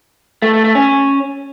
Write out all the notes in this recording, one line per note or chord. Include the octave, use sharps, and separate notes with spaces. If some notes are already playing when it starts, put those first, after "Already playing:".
A3
A3
A3
C#4